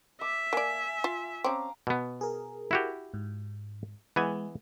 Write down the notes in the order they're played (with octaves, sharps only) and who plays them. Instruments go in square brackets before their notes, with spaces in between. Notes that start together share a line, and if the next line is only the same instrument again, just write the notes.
[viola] E5 [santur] D6
[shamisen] A#3 D5 [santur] G#5
[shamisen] F4
[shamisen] C4 C#4 [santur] F5 A#5 D6
[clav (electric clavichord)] B2 B3
[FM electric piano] G#4 A#4
[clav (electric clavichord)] E4 F#4 G4
[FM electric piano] G#2
[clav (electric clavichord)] E3 B3 G#5 [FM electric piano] G#3